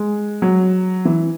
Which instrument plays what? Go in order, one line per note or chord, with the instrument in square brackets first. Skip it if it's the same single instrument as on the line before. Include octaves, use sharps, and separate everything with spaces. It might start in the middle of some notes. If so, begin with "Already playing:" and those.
Already playing: [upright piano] G#3
F#3
E3